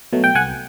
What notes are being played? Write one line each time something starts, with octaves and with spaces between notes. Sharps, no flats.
B2 F#3 A3
G5
C2 F#5 G#5